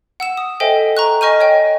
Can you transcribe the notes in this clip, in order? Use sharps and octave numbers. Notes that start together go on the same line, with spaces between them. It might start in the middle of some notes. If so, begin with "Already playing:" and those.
F#5 E6 E7
D#6
A4 C5 D#5 E5 G5 G#5
A#5 C#6 F#6
D#5 G#5 C#6 F6 G6 D#7
C#5 D#5 G5